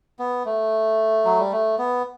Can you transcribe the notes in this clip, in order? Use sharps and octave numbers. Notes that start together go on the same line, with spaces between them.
B3
A3
F#3
G3
A3
B3